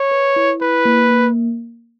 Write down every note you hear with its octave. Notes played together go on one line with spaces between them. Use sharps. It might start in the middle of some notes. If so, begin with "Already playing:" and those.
Already playing: C#5
B4
E4
E4 B4
A#3
A#3